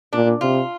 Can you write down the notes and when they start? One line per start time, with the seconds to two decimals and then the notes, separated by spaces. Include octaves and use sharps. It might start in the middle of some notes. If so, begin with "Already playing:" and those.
0.13 A#2 D4
0.41 C3 F4